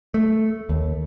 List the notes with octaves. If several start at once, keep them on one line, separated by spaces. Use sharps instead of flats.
A3
D#2